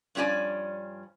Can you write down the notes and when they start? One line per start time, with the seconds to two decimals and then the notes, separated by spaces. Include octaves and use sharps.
0.15 G2 F3 C#4 G4 D5 G#5